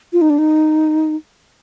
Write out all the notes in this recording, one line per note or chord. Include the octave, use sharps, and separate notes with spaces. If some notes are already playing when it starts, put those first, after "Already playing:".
F4
D#4
D4
D#4